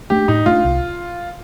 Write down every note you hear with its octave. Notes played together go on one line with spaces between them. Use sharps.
A3 D4 G4
A2 D#4
A3 D4 F4
C2